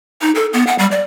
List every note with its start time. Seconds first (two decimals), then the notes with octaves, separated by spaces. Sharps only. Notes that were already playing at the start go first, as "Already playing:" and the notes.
0.21 D#4
0.35 A4
0.53 B3
0.67 F#5
0.79 G3
0.91 D5